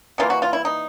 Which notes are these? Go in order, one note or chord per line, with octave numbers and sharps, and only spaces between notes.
C3 E3 G3 A#3 F4
F#4
F4
E4
D#4